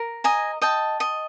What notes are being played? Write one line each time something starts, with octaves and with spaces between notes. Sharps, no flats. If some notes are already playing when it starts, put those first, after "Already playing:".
Already playing: A#4
D#5 G#5 A#5
D#5 G5 A5
D#5